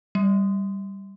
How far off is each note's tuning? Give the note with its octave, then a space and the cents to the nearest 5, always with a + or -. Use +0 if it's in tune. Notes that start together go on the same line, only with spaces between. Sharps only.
G3 +0